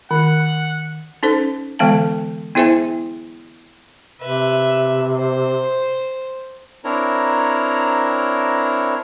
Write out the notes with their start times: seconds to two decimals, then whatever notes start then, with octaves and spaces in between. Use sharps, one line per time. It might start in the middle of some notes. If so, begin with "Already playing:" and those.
0.11 D#3 F#5
1.23 C#4 D#4 A4 C5
1.79 D3 E3 G#3 B3 F5 A5
2.55 B3 E4 G#4 C5 E5 G#5
4.21 C3 B4 E5
5.16 C5
6.85 C4 D4 E4 A#4 C#5 A#5